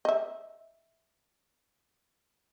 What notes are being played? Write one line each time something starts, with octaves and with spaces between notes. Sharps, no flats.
D#5 E5